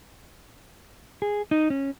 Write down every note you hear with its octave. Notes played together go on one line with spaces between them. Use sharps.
G#4
D#4
C#4